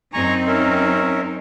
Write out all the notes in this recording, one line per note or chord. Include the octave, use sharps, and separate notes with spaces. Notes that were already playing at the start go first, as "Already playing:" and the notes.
F#2 C4 D#4 G#5 A#5 C#6
C#4 A#4 E5